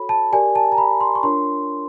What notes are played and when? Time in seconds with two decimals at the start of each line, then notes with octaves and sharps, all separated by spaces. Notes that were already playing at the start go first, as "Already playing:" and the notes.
Already playing: F#4 A4 C#5 B5
0.09 A5
0.32 G4 A#4 D5 G#5
0.56 A5
0.72 A#5
0.78 B5
1.01 C6
1.15 C#6
1.23 D4 F4 A#4 C#5 C6